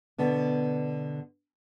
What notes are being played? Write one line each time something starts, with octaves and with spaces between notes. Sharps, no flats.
B2 D3 B3